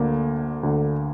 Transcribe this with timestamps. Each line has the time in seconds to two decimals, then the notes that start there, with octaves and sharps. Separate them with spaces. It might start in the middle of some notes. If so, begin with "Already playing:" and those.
Already playing: D2 D3 A#3
0.63 D2 D3